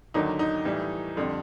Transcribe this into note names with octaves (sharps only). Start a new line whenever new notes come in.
D#2 D3 F#3 D#4
D#4
A2 E3 G3
F2 D3 G3